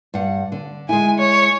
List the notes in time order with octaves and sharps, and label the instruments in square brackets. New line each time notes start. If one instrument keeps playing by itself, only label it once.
[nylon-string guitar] G2 F#5
D3
[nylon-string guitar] G#3 E4 [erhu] G#5
[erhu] C#5